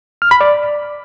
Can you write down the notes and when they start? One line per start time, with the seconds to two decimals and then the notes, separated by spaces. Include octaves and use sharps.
0.22 F6
0.31 B5
0.41 D5